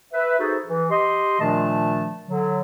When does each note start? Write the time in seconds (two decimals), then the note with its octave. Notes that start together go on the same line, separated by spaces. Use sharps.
0.13 B4 E5
0.39 D#4 F#4 G#4 A4 C5
0.67 E3
0.89 G4 D#5 C6
1.40 A#2 D#3 F3 A3 D4 A5
2.27 D3 F#3